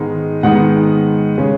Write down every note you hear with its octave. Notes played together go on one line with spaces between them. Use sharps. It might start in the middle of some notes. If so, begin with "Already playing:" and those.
Already playing: G#2 D#3 G#3 B3 D#4
G#2 D#3 G#3 B3 D#4 F#5
C#3 G#3 C#4